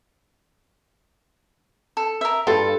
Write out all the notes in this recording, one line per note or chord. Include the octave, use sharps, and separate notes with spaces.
A4
A#4 E5
G2 F4 A4